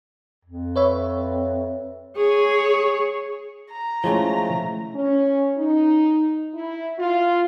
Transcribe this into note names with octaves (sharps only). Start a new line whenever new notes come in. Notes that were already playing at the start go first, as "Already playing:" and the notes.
F2
B4 C#5 E5
G#4 C#5
A#5
F3 G#3 A3 C#4 E4
C#4
D#4
E4
F4